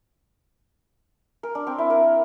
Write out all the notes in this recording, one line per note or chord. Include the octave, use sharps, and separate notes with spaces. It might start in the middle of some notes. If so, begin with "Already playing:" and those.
A#4
D4
C4
E4
A#4